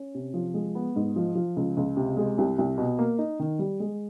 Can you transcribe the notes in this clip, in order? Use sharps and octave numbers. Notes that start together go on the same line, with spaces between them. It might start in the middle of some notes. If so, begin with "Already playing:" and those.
Already playing: C#4
C3
F3
G#3
B3
G#2
F3
F3
C#2
C#2
C3
G#3
C2
C2
B2
A#3
D#4
D#3
G3
G#3